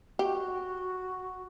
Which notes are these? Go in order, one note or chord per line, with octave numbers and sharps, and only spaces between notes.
F#4 G4